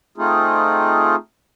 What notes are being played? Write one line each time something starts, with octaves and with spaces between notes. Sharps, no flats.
A3 C4 D#4 F4 G#4